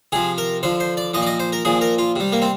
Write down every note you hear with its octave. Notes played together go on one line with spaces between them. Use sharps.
C3 F3 G#4
A#4
D3 F3 C5
C5
D5
A#2 F3 D#5
D5
D#5
C5
A#4
A#2 F3 G#4
A#4
F4
C3 G3
A#3
C4